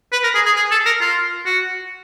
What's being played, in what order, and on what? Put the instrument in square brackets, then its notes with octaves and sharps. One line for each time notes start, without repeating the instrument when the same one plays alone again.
[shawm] B4
A#4
G#4
G#4
G#4
A4
A#4
F4
F#4